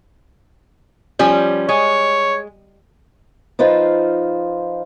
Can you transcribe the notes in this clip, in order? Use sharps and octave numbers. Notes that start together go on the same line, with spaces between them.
F3 G3 C#4
G#3 C#5
F3 D#4 F4 B4 C5